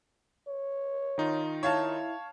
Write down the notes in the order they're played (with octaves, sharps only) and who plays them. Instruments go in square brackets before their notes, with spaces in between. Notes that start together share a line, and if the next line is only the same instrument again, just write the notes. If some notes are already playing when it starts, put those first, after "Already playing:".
[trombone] C#5
[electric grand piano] D#3 D#4 F4
[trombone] E4 [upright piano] C#5 F5 A5